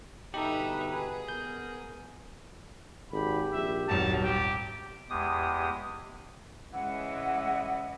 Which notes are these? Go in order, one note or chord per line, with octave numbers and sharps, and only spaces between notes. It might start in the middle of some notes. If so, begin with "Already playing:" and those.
G1 B2 D#4 G4 A4 B4 E5
G#4
B3 A#4 G6
G#1 G4 B5
A#1 E5
D#1 G#1 F#3 G3 A5
G4
E2 G#3 G4 D#6
C#3 E3 G#3 E4 D#5 F#5